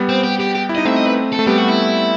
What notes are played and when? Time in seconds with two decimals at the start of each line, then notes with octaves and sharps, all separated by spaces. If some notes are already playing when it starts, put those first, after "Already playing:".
Already playing: G3 B3
0.09 C4
0.24 G4
0.40 G4
0.55 G4
0.69 E4
0.75 D#4 D#5
0.85 A3 C4 E5
0.96 D#5
1.06 B4
1.32 A4
1.39 A3
1.47 G3 B3 G4
1.57 F#4
1.68 E4